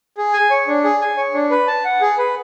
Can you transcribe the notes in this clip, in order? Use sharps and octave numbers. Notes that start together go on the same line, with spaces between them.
G#4
G#5
C#5
D4
G#4
G#5
C#5
D4
B4
A5
F#5
G#4
B4